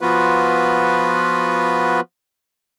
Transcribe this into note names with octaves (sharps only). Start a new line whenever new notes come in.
F3 B3 F4 F#4 B4